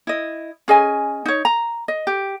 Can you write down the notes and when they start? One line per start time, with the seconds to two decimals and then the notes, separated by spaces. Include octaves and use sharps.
0.07 E4 D#5
0.68 C#4 G#4 D#5 G#5
1.26 D#4 C#5
1.45 A#5
1.88 D#5
2.07 G4